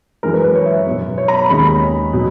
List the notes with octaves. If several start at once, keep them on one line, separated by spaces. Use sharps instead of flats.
F#2 E3 G#3 A#4
B4
B4
C#5
E5
B2 F#3 B3
C#5
A#5
B5
D#2 D#3 G#3 C#4 B5
B2 F#3